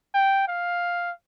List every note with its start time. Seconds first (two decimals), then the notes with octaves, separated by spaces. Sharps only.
0.14 G5
0.48 F5